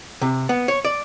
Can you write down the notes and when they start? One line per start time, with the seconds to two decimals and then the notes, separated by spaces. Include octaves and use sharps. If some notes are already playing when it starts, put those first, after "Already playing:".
0.21 C3
0.49 B3
0.68 C#5
0.85 D5